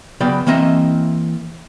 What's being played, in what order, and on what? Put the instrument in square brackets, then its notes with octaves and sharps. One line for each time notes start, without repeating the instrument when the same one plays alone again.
[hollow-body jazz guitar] C#3 F#3 B3 D5 G5 B5
E3 A#3 C4 D#5 E5